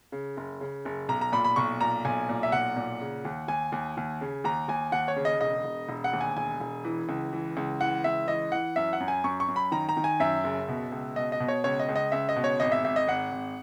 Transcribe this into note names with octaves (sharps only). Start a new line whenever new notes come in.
C#3
F#1
C#3
F#1
B1 A#5
A#5
A#2 B5
B5
B1 C#6
A#2 A#5
B1 G#5
A#2
E5
B1 F#5
A#2
C#3
D#2
D#2 G#5
D#2
D#2
C#3
D#2 A#5
D#2 G#5
D#2 F#5
C#5
C#3
D#5
E1 D#5
E1
E1
F#5
D#2
G#5
E1 G#5
E1
E3
C#2
E3
C#2
E3 F#5
C#2 E5
E3 D#5
E3 F#5
F#2 E5
F#5
F#2
G#5
F#2 C#6
C#6
F#2
B5
D#3 A#5
A#5
D#3
G#5
F#2 E5
F#1
B2
C#2
B2 D#5
D#5
B2
C#5
C#2 C#5
D#5
C#2
D#5
C#2 E5
D#5
B2
C#5
G#1 D#5
E5
G#1 E5
D#5
G#1 F#5
G#1